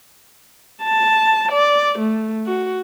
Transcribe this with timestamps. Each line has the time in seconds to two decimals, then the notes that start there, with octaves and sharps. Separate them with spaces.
0.83 A5
1.52 D5
1.99 A3
2.47 F#4